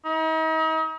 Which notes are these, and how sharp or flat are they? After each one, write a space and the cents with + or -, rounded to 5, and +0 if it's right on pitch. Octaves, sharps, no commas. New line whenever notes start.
D#4 +40